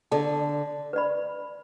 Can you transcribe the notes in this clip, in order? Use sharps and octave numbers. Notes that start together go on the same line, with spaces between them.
D3 A4 D5 A5
B4 D5 B5